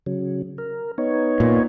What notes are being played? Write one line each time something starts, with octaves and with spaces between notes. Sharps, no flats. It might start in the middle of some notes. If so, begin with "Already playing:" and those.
C#3 F#3
A#4
B3 D#4 C#5
A#2